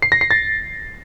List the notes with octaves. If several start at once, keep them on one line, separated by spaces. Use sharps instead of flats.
C7
A#6
C7
A6